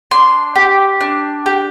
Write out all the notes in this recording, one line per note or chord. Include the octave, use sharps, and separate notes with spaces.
D4 C6
G4
D4
G4